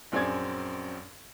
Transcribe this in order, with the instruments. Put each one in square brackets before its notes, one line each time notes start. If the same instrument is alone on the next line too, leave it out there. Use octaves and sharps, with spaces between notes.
[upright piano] A#1 F#2 C4 G#4 D5 G#6